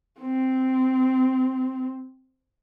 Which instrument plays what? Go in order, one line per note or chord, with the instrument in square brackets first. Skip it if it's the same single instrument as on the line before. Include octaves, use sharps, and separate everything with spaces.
[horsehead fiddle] C4